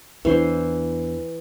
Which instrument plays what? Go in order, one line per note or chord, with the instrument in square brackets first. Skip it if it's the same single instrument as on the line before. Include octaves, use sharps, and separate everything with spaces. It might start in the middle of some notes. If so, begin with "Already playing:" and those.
[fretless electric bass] E2 A3 D4 [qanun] E3 C5